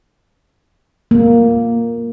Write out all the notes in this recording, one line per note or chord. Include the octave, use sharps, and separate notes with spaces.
A#3